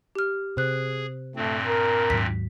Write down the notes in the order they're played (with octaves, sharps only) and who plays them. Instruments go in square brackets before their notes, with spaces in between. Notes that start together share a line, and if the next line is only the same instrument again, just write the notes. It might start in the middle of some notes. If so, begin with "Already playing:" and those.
[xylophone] G4 F6
[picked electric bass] C3 [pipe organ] G#4 [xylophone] C5 F#6
[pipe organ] G2 A#2 C4 [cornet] A3
[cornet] A#4
[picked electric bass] D#2 G#2 F#3 [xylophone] B6